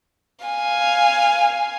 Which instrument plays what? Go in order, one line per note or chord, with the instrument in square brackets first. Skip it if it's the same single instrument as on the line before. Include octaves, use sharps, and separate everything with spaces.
[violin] F5 G#5